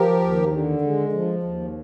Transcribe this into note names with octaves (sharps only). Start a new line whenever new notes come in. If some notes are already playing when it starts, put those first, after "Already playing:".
Already playing: F3 G4 A#4
D#2
D3
G#3
F3
D#2